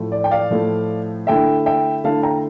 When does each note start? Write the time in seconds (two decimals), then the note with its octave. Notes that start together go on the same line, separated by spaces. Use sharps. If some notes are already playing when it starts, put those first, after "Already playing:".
Already playing: A2 F3 A3
0.12 D5
0.24 G5
0.31 D5 F5
0.51 A2 F3 A3
1.27 D3 A3 E4 E5 G5
1.66 E5 G5
2.04 D3 A3 E4 F5 A5
2.23 G5 A#5